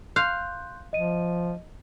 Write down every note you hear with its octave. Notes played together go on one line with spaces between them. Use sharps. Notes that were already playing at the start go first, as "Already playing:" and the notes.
F5 C6 F#6 G6
F3 D#5 D#7